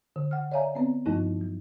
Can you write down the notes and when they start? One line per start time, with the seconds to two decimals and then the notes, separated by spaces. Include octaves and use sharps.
0.16 D3
0.31 F#5 G5 F6
0.52 C#5 D5 E5 F5 G#5 A#5
0.75 B3 C4 B4
1.06 G2 F3 A3 D#4 E4
1.41 F#3